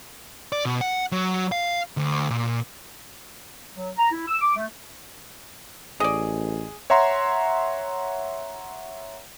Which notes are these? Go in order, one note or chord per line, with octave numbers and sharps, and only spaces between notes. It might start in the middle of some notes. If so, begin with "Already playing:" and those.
D5
B2
F#5
F#3
F5
D2
A#2
F#3
A#5
E4
E6
D6
A3
A1 G#4 D5 D#5
C#5 E5 F#5 A#5 C6